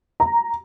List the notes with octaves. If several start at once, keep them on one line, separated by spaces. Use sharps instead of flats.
A#5